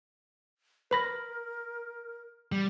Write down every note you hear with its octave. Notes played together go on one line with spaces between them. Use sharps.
A#4 B4 B5 A#6
G3